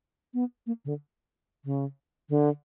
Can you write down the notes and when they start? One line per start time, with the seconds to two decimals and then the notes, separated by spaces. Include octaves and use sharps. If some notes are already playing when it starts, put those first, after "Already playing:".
0.34 B3
0.67 A#3
0.85 C#3
0.88 D3
1.65 C#3
2.30 D3